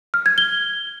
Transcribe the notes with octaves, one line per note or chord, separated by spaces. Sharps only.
F6
G#6
G7